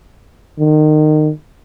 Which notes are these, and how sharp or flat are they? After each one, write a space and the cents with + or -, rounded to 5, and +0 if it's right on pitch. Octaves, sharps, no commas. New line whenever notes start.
D#3 -25